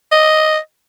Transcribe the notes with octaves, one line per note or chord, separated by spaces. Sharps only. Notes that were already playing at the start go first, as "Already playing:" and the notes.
D#5